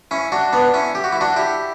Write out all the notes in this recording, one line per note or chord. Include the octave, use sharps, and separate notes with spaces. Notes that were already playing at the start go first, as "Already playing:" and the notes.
C#4 E4
D4 F#4
B3 D4
C#4 E4
G4
F#4
E4
D4 F#4
E4 G4